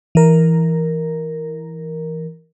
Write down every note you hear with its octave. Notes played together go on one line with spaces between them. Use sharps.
E3 A#4